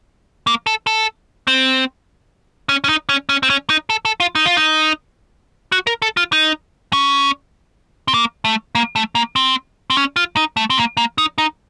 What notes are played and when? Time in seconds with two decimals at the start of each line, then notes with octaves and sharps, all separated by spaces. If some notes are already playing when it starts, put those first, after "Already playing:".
0.47 A#3
0.67 A4
0.87 A4
1.47 C4
2.69 C#4
2.84 C#4
2.89 D#4
3.09 C#4
3.29 C#4
3.43 C4
3.50 C#4
3.70 D#4
3.90 A4
4.05 A4
4.20 F4
4.35 D#4
4.46 F4
4.57 D#4
5.72 F#4
5.87 A#4
6.02 A4
6.17 F4
6.33 D#4
6.93 C#4
8.08 C4
8.14 A#3
8.45 A3
8.75 A#3
8.96 A3
9.15 A#3
9.36 C4
9.90 C4
9.97 C#4
10.16 F4
10.37 D#4
10.57 A3
10.70 C4
10.77 A#3
10.97 A#3
11.18 D#4
11.38 D#4